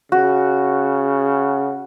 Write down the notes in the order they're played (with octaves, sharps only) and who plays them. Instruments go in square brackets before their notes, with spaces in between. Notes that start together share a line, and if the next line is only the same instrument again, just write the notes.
[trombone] C#3 [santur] F#4